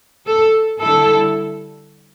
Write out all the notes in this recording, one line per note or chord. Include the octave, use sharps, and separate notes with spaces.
A4
D3 G3 E4 A4